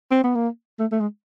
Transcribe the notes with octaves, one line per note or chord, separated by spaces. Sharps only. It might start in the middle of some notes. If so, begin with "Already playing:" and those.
C4
B3
A#3
A3
A3
G#3